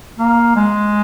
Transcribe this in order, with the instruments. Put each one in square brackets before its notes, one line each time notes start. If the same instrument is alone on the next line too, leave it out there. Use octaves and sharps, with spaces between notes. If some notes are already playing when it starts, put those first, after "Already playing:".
[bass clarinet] A#3
G#3